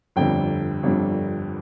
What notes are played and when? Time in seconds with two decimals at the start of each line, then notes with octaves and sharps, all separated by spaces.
0.16 G1 F2 D3 G3 G5
0.83 G1 F2 D3 G3